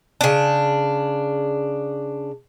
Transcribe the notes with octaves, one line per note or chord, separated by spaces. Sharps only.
C#3 D4